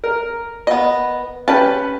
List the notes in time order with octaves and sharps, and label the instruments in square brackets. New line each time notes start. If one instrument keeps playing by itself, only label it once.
[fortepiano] A#4
[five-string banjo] B3 D#5
[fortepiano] C#4 G4 B4 [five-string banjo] A5